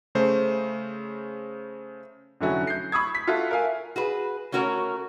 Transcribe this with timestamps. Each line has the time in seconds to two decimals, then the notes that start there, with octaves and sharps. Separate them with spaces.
0.15 C#3 A3 C5
2.41 F1 D3 F#3 C#4 E4 F#4
2.67 G6 C7
2.92 B5 C#6 D#6 E6 G#6
3.15 B6
3.27 F4 F#4 A4 E5
3.51 A#4 E5 F5 G#5
3.96 F#4 G#4 B4
4.52 A3 C#4 F#4 A#4 C#5